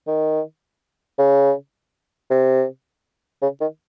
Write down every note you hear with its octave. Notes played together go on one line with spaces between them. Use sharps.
D#3
C#3
C3
C#3
D#3